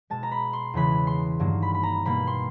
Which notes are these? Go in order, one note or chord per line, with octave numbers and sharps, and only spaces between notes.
B2 G#3 A5
A#5
B5
C6
E2 C#3 E3 G#3 B5
C6
G2 D#3 F#3 A#3
B5
B5
A#5
B2 G3 A#3 B5
C6